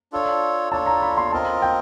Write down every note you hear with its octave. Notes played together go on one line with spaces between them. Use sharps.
D4 F4 A4 C#5
D4 F4 A4 C#5 A5
A#5
B5
C6
C4 F4 A#4 D#5 A5
G5